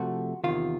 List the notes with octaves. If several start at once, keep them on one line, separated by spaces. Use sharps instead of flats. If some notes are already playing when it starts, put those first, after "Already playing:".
Already playing: C3 F3 A3 F#4
E2 C3 D#3 F4